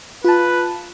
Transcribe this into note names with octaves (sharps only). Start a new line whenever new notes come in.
F4 B4 A5